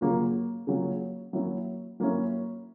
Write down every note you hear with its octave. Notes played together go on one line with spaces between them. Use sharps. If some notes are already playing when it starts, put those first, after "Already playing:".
C#3 F#3 A#3 C#4 F4
C#3 F#3 A#3 C#4 F4
F#3 A#3 C#4 E4
F#3 A#3 C#4 E4